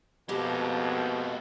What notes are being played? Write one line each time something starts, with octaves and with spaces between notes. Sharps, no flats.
F2 B2 G#3 A#3 G4 A5